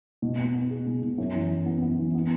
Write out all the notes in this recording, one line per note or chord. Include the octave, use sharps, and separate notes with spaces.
B2
B3
B3
G#4
B2
B2
F#2
E3
F#2
B3
B3
E3
B3